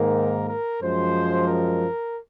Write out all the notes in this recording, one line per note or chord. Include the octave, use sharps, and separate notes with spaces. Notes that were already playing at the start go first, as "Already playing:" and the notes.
Already playing: G#2 D#3 A#3 A#4
A#4
F#2 F3 G#3 C5
A#4